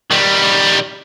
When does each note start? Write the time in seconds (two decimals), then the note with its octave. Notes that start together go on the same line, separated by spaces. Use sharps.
0.11 D#3 G3